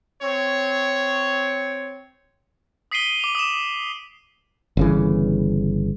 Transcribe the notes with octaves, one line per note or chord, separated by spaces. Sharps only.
C4 C#5
D#6 B6 C7 D7 D#7 G7
D6 F7
D#6 E7
G1 C#3 E3